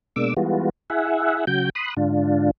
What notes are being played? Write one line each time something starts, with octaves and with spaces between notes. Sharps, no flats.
B2 G#3 A#3 D4 D6 E6
E3 G3 G#3 B3 F4 F#4
E4 G#4 E5 F#5
C#3 F#3 F#4 G5 G6
B5 C6 D#6 F#6
G#2 D3 D4 F4